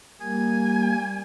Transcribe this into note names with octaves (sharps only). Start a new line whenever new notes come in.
G3 A#3 G#5